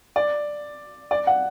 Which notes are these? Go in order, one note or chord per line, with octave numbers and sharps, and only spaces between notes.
D5
D5
F#5